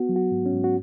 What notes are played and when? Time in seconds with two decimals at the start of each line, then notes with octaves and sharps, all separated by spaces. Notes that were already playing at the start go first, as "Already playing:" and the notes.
Already playing: B3 F#4
0.09 F#3
0.16 F#4
0.31 G#2
0.46 C#4
0.53 G#2
0.64 F#4